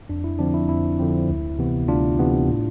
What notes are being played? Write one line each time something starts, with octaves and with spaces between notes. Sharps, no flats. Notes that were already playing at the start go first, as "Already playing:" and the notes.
F2 D4
E4
D3 F3 C4 D4
E4
F2 E4
D3 F3 C4
D2
C3 E3 B3
D2 D4 F4
C3 E3 B3
A2